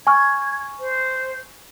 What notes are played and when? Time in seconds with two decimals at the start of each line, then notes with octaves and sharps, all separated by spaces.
0.07 G#5 C#6 F6 G#6
0.80 C5